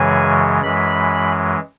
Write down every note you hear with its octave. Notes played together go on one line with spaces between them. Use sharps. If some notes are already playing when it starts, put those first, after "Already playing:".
Already playing: F#2 C#3 E3 G#3 G#5
F#2 E3 G#3 B5